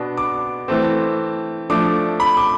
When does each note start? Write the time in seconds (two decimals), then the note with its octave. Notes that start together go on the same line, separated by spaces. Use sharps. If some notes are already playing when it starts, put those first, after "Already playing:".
Already playing: B2 B3 D4
0.17 D6
0.68 E3 A3 C4
1.70 F3 A3 D4 D6
2.20 B5
2.37 D6